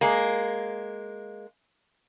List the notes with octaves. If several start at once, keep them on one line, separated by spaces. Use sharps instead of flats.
G#3 A#3